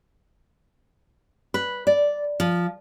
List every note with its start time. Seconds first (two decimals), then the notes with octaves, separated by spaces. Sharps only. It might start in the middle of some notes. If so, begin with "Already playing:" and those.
1.54 B4
1.87 D5
2.40 F3